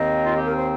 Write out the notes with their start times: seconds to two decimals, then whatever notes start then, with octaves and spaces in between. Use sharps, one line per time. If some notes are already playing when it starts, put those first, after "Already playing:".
Already playing: D#2 D#3 C4 D#4 D#5
0.26 F4
0.36 G4
0.46 A#4
0.56 C5